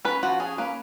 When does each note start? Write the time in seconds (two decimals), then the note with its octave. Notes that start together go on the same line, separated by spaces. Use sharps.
0.05 C#4 B4
0.23 F3 F#4
0.40 C#4 G#4
0.58 A#3 B4